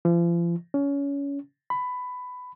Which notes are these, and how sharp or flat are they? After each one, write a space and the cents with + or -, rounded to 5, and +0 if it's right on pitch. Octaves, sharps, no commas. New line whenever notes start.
F3 -40
C#4 +25
B5 +15